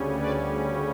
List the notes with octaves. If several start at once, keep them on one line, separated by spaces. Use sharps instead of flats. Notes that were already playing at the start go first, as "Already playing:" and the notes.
Already playing: D2 C#3 G3 C#4
B4 D5